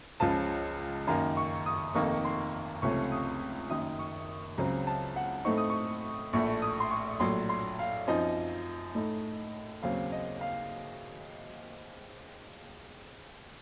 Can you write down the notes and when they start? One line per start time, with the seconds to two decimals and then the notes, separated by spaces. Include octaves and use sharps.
0.20 C#2 C#3 F3 A5
1.07 F#2 D#3 A#3 A#5
1.37 C#6
1.66 D#6
1.95 F1 F2 D#3 A#3 D#4 C#6
2.25 C6
2.82 C#2 C3 F3 A3 C#4 C#6
3.12 D#6
3.70 F#1 F#2 D#3 D#6
3.99 C#6
4.58 C#2 C#3 F#3 C4 A#5
4.87 A5
5.16 F#5
5.45 A2 A3 C4 D#4 C#6
5.58 D#6
5.70 C#6
6.33 A#1 A2 A3 C#6
6.62 D#6
6.80 C6
6.91 C#6
7.20 A#1 A2 F#3 C6
7.49 C6
7.79 F5
8.07 F#2 F3 C4 D#4 D#5
8.95 A2 A3 D#4
9.83 D#2 C#3 F#3 C4 F5
10.12 D#5
10.41 F5